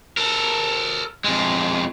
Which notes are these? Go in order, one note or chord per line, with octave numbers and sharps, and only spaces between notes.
A4 A#4
F2 G#3